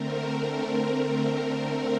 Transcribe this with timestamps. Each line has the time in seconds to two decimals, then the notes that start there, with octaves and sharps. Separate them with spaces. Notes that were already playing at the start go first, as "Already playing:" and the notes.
Already playing: D3 A3 C4 A#4
0.26 A#4